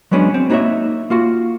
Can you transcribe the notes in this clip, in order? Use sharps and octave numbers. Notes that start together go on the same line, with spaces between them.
F#3 G#3 B3 C#4 D4
C4
A#3 D#4 F#4 A#4 C#5 E5
A#3 F4 F#4